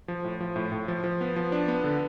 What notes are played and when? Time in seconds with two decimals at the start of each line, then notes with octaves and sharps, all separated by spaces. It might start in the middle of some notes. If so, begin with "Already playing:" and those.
0.08 F3
0.24 A2
0.41 F3
0.56 A2
0.72 A2
0.88 F3
1.04 F3
1.21 B3
1.36 F3
1.52 D4
1.68 B3
1.84 D3